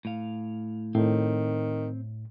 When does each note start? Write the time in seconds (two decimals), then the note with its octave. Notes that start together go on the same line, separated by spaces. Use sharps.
0.05 A2 F5
0.95 A2 D#3 C4